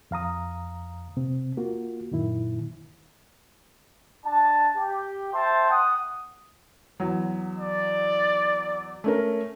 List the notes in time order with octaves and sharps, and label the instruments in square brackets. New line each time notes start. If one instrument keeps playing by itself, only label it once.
[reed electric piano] F2 F5 A#5 D#6
C3 C4
A#3 F4 F#4
F#2 A#2 D#3 E4
[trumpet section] D4 A5
G4
C5 E5 G5 A5 C6
F#5 D#6
[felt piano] E2 F#3
[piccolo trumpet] D5
[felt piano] A3 C#4 A#4